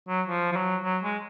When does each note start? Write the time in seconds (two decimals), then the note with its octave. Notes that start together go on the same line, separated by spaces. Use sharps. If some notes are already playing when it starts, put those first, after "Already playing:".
0.08 F#3
0.27 F3
0.52 F3
0.56 F#3
0.84 F#3
1.03 G#3